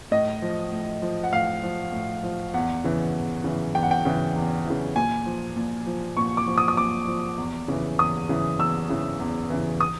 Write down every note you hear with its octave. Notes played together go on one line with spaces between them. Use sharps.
A2 D#5
F3
A2
F3
F#5
A2 F5
F3
A2
F3
E2 F#5
C#3 E3
E2
C#3 E3
E2 G5
F#5
G5
C#3 E3
E2
C#3 E3
A#2 G#5
F3
A#2
F3
A#2 C#6
D6
F3
D#6
D#6
A#2 D6
F3
E2
C#3 E3
E2 D#6
C#3 E3
E2 E6
C#3 E3
E2
C#3 E3
D#6